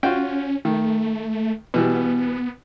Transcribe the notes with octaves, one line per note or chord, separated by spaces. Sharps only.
C#4 F4 F#4 G5
D#3 A3
B2 E3 G3 B3